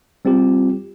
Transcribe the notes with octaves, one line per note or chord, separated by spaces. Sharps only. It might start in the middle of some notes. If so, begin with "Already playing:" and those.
G3 C4 F4 G4